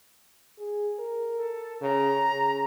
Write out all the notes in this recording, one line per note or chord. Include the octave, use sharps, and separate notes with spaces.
G#4
A#4
A4
C#3 A#5
C#3